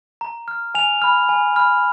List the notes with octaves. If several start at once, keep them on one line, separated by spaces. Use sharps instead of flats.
A#5
F6
G#5 F7
B5 F6
G#5
B5 F6